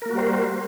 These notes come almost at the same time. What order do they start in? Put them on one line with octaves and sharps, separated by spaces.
A#4 A#3 F#4 G3 C5